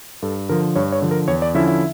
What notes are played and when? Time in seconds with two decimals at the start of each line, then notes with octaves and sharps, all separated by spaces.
0.22 G2 A4
0.49 D3 F3 A#4
0.76 G2 C#5
0.92 C#5
1.02 D3 F3
1.11 A#4
1.28 E2 C#5
1.42 D5
1.55 D3 F3 C#4 E4 E5
1.68 E5